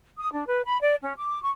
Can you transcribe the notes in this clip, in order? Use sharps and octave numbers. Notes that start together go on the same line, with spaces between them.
D#6
D4
B4
B5
D5
C#4
D6
C#6